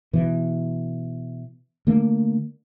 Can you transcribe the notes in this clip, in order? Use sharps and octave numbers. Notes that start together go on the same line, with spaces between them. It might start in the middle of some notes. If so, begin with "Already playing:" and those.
B2 E3
D3 A3 A#3